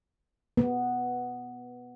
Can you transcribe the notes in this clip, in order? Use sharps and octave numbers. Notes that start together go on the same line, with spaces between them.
B3